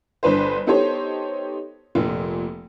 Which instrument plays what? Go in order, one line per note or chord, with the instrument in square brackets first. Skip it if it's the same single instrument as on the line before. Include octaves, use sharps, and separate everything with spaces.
[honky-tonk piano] G1 D4 B4 C5
B3 D#4 G4 A4 C5 C#5
F1 A#2